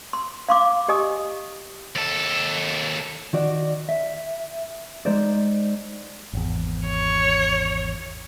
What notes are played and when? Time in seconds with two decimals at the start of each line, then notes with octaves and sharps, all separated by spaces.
0.13 C6
0.49 F5 C6 D6
0.88 G4 D#5 G#5 D#6
1.95 D#2 A4
3.33 D#3 F#4 D5
3.89 E5
5.06 G#3 D#4 C5 D5
6.33 G#1 E2
6.87 C#5